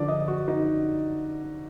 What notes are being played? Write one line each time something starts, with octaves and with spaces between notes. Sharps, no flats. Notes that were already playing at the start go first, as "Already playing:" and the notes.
Already playing: D3 F3 D5
D#5
F#4
D#4